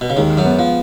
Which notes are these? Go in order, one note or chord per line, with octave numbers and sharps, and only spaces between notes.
B2
C#3
D#2 D#3 G#3
F#2 F#3
B3
F3